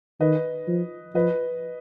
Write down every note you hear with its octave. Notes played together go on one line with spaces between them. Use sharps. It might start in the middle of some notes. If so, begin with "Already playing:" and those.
D#3 B4 D#5
F3
F3 B4 D#5